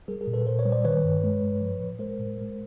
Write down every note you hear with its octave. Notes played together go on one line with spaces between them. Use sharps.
G3 G#4 A#4
G#4 A#4
A#2
A4 B4
A#2 A#4 C5
B4 C#5
G3
C5 D5
D#3 B4 C#5
G2
G#3
G2
F3
A2
G#3 A#4 C5
A2
G#3